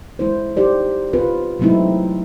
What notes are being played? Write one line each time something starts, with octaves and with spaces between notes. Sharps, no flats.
G#3 E4 C5
D#4 G4 C5 D5
C4 F4 B4
F#3 G#3 A3 C4 D#4 E4